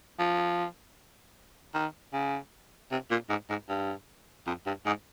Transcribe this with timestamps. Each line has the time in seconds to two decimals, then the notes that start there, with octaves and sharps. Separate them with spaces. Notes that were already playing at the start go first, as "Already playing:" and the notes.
0.19 F3
1.74 D#3
2.13 C#3
2.91 C3
3.11 A#2
3.30 G#2
3.50 G#2
3.69 G2
4.47 F2
4.66 G2
4.86 G#2